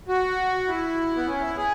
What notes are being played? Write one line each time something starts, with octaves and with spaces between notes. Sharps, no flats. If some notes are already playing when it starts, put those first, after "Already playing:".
F#4
E4
B3
C#4
E4
G#4